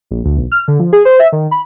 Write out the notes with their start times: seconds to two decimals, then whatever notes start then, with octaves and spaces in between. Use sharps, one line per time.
0.11 A#1
0.25 D2
0.37 B1
0.52 F6
0.68 D3
0.79 F3
0.93 G#4
1.05 C5
1.19 E5
1.32 D#3
1.51 B5